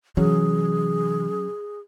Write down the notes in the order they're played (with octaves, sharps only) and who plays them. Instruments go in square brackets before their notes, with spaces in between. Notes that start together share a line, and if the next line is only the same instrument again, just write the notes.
[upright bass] C3 E3 [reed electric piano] F#3 C#4 [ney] G#4